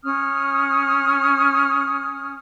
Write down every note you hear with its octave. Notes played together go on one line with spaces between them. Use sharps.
C#4 D#6 F6